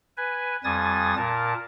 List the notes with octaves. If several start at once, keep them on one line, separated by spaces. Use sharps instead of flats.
B4 G#5
F2 G3 G#5 D#6 A6
A#2 A#4 A5